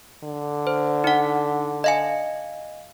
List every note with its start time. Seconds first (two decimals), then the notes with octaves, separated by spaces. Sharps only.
0.23 D3
0.67 C5
1.04 D#4 F#5
1.84 D#5 F5 G#5